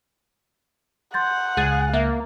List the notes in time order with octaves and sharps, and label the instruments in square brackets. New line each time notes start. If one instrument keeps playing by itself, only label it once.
[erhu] F#5 [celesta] C6 G6 A6
[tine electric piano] C#2 F#6 A6 [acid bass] G#4 [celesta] D#7
[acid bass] A#3 [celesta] E5